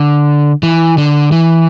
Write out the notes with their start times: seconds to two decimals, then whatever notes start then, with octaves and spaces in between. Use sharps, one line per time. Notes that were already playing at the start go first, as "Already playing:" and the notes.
Already playing: D3
0.63 E3
0.98 D3
1.32 E3